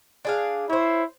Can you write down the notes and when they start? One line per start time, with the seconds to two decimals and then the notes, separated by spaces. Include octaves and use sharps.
0.25 D4 G#4 F5
0.70 E4 C5 C#5